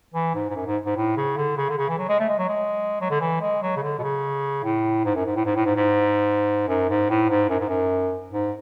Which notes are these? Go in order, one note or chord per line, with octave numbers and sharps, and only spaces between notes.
E3
G#2
G#2
F#2
G#2
G#2
A2
C#3
D3
C#3
D3
C#3
E3
F#3
G#3
A3
G#3
F#3
G#3
F#3
D3
E3
G#3
F#3
C#3
D3
B2
C#3
A2
G#2
F#2
G#2
A2
G#2
A2
G#2
G#2
F#2
G#2
A2
G#2
F#2
G#2
F#2
G#2